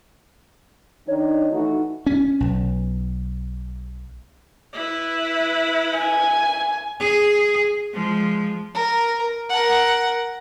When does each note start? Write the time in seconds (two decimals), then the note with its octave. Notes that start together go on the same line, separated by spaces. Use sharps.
1.08 D#3 D4 D#4 C#5
1.52 E3 A3 D#4 F#4
2.06 C#4
2.40 B1
4.73 E4 B4
5.98 G#5
7.00 G#4
7.93 F3 G#3
8.74 A#4
9.50 A#4 F#5